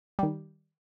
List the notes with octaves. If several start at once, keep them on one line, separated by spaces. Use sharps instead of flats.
D#3 G3